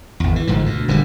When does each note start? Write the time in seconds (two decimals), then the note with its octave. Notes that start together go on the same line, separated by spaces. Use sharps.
0.20 G#1 E2
0.36 E3
0.47 G#1 G#2 D3 F3
0.64 D2 B2
0.88 D#1 D3 F3 G3